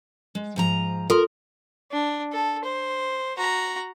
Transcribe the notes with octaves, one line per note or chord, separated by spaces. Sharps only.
G#3
G#2 F3 A#5
F4 A4 A#4 C6
D4
A4
C5
F#4 A#5